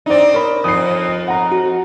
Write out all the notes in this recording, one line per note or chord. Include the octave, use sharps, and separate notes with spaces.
C4 D4 D#4 D5
A#4 C#5 B5
F2 D#4 D#6 C7
F#5 A#5
F#4